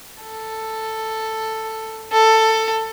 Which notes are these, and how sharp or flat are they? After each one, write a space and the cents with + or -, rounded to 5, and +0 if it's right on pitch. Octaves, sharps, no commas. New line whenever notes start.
A4 +5
A4 +15